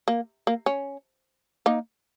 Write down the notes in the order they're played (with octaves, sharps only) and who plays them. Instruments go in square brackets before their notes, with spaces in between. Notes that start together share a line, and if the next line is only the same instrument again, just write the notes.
[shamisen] A#3
A#3
C#4
A#3 D#4